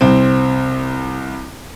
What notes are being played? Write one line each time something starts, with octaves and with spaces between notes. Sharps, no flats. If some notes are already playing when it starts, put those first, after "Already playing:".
C2 C4